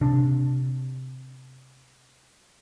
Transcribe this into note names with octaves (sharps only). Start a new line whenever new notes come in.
C3 D4